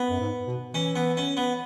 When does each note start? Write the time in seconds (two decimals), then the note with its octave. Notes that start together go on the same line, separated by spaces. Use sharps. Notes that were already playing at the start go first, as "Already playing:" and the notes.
Already playing: B3
0.09 F#2
0.20 G#2
0.47 B2
0.74 E3 C#4
0.96 B3
1.17 C#4
1.37 B3